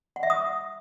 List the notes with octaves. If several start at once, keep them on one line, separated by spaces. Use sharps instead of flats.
F#5
E5
D#6